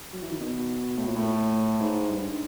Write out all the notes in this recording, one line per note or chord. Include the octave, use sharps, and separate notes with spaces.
F#3
E3
D#3
B2
A2
A#2
A2
G#2
G2